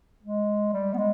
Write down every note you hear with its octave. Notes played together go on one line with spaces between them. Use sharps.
G#3
G3
B3
G#3